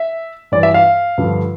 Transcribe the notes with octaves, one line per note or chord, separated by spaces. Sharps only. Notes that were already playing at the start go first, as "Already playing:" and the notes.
Already playing: E5
G2 E3 D5
E5
F5
G2 D3 F3